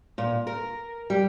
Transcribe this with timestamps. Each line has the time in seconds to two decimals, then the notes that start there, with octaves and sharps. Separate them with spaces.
0.18 A#2
0.47 A#4
1.10 G3